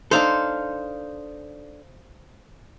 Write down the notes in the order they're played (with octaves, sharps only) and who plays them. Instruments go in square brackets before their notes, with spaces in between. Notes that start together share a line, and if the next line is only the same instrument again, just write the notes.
[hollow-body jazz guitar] D4 D#4 A4 [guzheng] C5 F5